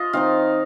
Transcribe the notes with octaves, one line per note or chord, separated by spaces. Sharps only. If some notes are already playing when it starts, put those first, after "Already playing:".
Already playing: F4 D#5
D#3 C4 D#4 F5